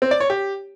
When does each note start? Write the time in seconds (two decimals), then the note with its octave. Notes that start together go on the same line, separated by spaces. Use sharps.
0.02 C4
0.11 D5
0.20 C#5
0.30 G4